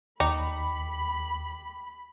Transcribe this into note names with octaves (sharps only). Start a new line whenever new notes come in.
D#2 D#4 G5 B5 D6 C#7